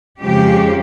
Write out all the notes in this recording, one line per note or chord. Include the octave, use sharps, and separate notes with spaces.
F2 C#3 F3 G#3 G4